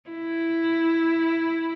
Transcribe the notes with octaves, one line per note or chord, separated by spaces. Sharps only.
E4